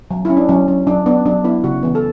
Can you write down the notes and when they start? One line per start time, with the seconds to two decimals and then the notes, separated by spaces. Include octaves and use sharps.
0.11 F#3
0.25 C#4 E4
0.37 D4
0.49 F#3 C#4
0.68 C#4
0.87 F#3 D4
1.06 B3 D4
1.26 F#3 D4
1.44 B3 E4
1.64 C#3 F#4
1.83 E3 B3
1.95 A4